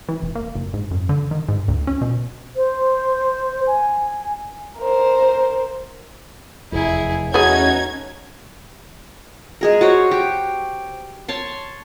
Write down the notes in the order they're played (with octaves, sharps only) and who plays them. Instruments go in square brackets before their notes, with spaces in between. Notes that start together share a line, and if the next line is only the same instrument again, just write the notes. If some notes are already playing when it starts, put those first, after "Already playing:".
[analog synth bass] E3
F1
A#3
F#1
G#2
F#2
D3
D#3
G#2
D2
C#4
B2
[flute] C5
G#5
[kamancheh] A#4 C5
[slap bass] F1 E2 [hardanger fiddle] E4 G#4
[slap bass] E2 [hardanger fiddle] A3 F#4 [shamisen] B3 G#4 [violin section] C#4 D#4 G#6
[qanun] G#3 G#4 A#4
F#4 C5 C#5
G4
C#5 A5 C6